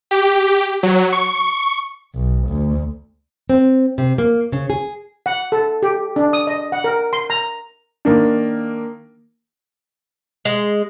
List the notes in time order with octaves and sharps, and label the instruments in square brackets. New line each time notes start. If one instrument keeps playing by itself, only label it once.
[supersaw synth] G4
F#3
C#6
[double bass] B1
D2
[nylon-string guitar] C4
C3
A#3
C#3
G#4
[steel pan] F#5
A4
G4
D4
D#6
D#5
F#5
A#4
C6
A#5
[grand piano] D#3 A#3 D4
[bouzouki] G#3